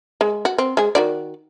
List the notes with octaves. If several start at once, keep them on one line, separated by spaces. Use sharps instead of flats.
G#3
F#4
C4
G#3 G#4
D#3 F#4 D5